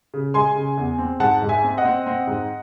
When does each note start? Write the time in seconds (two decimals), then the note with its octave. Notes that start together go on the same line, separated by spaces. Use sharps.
0.14 C#3
0.34 G#3 G#5 C6
0.55 C#3
0.77 E2
0.98 C4
1.20 G#2 F#5 A5
1.42 G#2
1.49 E5 G#5
1.64 C4
1.77 D#5 F#5
1.85 C4
2.07 C4
2.27 G#2